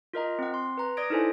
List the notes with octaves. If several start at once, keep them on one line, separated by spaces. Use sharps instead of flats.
F4 A#4 D#5 A#5
C4 F#5
C6
B4 A#5
D5 D#6 G#6 A#6 D7
D#4 E4 A4 C5 G#5